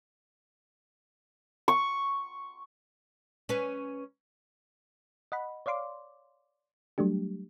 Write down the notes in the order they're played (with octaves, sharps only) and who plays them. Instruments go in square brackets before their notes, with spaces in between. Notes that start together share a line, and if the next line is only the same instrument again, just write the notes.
[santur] C#6
[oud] C#4 B4
[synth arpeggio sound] D#5 F#5 B5
C#5 D5 F5 C6 D6
F#3 G3 A3 D4 G4